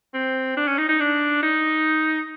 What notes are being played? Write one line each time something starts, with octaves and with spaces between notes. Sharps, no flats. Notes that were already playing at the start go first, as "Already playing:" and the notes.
C4
D4
C#4
D#4
D#4
D4
D#4